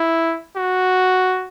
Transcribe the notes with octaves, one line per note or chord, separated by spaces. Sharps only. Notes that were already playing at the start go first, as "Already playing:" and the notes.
Already playing: E4
F#4